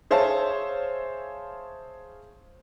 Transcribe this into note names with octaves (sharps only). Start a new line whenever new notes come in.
G#4 C5 C#5 E5 F5 A5